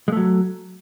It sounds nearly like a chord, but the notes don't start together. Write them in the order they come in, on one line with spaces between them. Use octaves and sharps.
G#3 A3 F#3